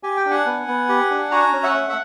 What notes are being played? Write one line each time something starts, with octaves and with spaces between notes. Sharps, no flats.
G4 G#5
G5
D4
F#5 G#5
B3
B3
G4
D4
F#4 G#5 A#5
C#4
E5 F#5
A3
E5